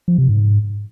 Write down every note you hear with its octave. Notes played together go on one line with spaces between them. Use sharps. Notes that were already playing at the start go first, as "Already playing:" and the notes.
F3
C3
G#2